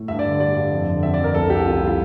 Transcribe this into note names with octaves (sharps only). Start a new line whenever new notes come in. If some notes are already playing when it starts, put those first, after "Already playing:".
Already playing: A2
G2 E5
D5
D3
G3 D5
G2
F2
D3
F2 E5
D5
F2
A#4
C2 A4
C2 G4
C2 F4
E4
G3
F4